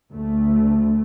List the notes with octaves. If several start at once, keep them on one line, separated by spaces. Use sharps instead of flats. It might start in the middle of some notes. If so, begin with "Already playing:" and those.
D2 A3